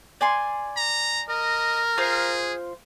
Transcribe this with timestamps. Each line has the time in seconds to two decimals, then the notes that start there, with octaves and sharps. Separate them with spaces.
0.21 D5 G#5 C6
0.77 A#5
1.29 A#4 D#5
1.98 F4 G#4 C5